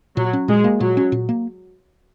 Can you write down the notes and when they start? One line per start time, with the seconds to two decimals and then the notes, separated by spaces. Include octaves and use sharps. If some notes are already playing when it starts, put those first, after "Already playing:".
0.17 A#2 F#3
0.33 C#4
0.48 A#2 G#3
0.64 A#3
0.80 A#2 F#3
0.97 C#4
1.12 A#2
1.29 A#3